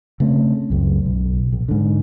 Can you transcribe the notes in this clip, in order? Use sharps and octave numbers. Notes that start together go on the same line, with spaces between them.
C#3 A3 C4
C#2 F#2
B1
A#1
G#2 D3